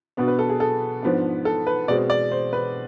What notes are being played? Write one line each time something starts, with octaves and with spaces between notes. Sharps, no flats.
B2 B3 D4
B4
A4
G#4
A4
G#2 F3 B3 D4
A4
B4
B2 G#3 C4 D5
D5
C5
B4